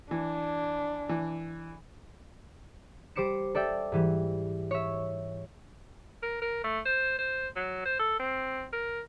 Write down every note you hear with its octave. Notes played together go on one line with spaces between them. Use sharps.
E3 D4
E3
G3 C5 D6 C#7 E7
A4 D5 E5 G5
G#2 E3 G3
C#5 E5
A#4
A#4
A3
C5
C5
F#3
C5
A4
C4
A#4